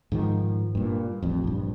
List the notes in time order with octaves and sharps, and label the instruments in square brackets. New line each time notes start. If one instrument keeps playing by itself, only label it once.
[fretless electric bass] G#2 D#3 F3
G2 A#2
A1 F2
A#1 G2